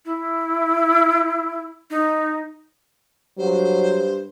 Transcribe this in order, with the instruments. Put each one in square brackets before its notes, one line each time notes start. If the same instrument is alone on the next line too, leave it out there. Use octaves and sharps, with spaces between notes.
[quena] E4
D#4
[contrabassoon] G2 [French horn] F#3 [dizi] C5